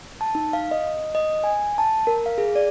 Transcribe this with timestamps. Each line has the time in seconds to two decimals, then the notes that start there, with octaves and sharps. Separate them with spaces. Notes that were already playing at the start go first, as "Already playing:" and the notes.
0.21 A5
0.35 D#4
0.53 F5
0.71 D#5
1.15 D#5
1.44 G#5
1.78 A5
2.07 A#4
2.26 F5
2.38 G#4
2.55 D5